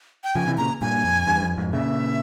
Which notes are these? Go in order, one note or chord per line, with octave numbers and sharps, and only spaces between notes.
G5
C#3 F3 G#5
C3 E3
A#2 C#3 A#5
G2 A#2 G#5
F2
E2 G2
F2
F2 G#2
A#2 C#3 E5